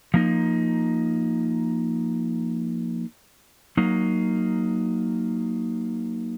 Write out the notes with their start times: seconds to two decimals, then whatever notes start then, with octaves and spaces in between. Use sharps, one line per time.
0.14 F3 A#3 D#4
3.77 F#3 A#3 D#4